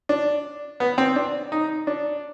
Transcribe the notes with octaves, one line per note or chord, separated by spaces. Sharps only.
D4
B3
C4
D4
D#4
D4